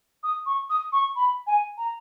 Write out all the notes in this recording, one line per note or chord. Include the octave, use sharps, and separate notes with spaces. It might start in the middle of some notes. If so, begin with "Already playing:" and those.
D#6
C#6
D#6
C#6
B5
G#5
A#5